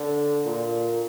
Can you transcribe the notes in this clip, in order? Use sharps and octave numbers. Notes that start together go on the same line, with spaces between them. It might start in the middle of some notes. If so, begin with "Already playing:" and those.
Already playing: D3
A#2